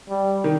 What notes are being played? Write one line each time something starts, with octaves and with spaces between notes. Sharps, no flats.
G3
D#3